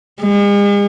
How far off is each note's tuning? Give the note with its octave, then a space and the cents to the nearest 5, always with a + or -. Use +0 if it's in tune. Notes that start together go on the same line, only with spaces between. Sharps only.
G#3 -40